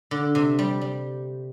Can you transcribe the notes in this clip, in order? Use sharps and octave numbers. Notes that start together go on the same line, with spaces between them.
D3
C3
G3
G3